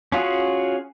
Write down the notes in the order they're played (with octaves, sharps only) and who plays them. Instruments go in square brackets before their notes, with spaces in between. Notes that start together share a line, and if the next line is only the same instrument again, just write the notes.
[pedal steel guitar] C#4 F4 F#4 G#4